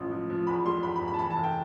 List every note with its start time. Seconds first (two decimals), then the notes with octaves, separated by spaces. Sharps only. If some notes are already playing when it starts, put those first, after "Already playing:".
Already playing: A1 F3
0.12 F3
0.30 F3
0.47 E2 B5
0.65 G3 C6
0.83 E2 B5
0.96 B5
1.01 E2
1.08 B5
1.14 A5
1.19 E3 B5
1.30 A5
1.37 F1
1.43 G5